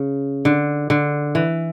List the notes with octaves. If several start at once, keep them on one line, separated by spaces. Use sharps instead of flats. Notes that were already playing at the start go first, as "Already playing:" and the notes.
Already playing: C#3
D3
D3
E3